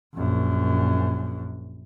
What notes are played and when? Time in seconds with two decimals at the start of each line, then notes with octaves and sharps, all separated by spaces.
0.15 A#1 F#2